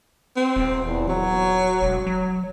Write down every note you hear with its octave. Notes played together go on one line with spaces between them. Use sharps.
C4
D#1
E2
F#3
E1
F#3